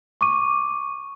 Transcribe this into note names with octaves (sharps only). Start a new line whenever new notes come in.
C#6 D6 D#7